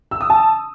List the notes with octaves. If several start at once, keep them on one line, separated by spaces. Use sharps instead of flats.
E6
D#6
A5